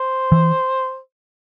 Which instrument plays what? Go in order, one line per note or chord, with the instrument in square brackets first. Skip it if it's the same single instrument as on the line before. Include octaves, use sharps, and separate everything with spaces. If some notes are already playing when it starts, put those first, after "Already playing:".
Already playing: [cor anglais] C5
[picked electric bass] E3